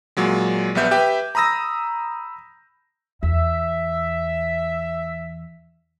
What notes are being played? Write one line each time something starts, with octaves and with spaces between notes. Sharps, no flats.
A#2 F#3 G#3
A#1 G3 B3 E5 G6
G4 B4 E5 G5
A#5 B5 D#6 E6 A#6
E2 E5